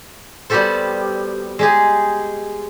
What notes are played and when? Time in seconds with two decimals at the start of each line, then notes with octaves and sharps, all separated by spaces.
0.50 G3 B3 F#4 G4 A4 C5
1.59 G#3 G4 G#4